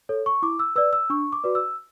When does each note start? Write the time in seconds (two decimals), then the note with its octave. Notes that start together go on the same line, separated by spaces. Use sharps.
0.09 A4 C#5
0.26 C#6
0.42 E4 D6
0.59 E6
0.76 B4 D5 E6
0.93 E6
1.10 D4 C#6
1.33 D6
1.44 F#4 B4 D5
1.55 E6